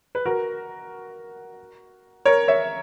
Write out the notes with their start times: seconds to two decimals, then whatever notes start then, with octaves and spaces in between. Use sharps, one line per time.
0.15 B4
0.26 F#4 A#4
2.25 A#4 C#5
2.48 C#5 E5